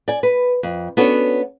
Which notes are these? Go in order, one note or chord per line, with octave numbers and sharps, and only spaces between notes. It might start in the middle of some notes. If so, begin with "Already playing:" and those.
D5 G#5
B4
F2
B3 C#4 D4 F#4 A4 C#5